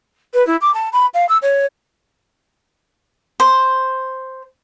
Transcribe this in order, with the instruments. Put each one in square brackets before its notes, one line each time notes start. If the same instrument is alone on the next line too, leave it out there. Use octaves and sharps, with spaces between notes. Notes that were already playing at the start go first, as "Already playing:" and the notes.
[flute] B4
E4
D6
A5
B5
F5
E6
C#5
[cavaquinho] C5